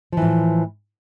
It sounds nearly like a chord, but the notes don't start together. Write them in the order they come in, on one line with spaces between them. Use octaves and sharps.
F3 E3 A2